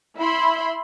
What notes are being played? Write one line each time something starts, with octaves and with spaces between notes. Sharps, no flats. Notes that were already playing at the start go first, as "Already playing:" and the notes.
E4 E5 B5 C6